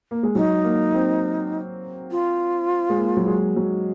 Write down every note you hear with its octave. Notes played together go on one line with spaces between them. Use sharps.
A#3
G#3
F#3 D#4
A#3
C4
F4
G#3
A#3
F#3
G#3
F#3